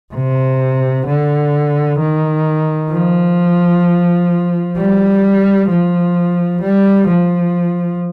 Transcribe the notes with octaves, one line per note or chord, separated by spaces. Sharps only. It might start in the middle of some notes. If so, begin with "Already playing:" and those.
C3
D3
D#3
F3
G3
F3
G3
F3